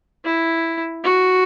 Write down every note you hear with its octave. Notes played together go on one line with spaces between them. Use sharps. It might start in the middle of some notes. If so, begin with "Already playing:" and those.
E4
F#4